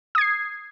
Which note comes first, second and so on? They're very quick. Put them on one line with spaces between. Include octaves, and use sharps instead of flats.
D#6 G#6 C7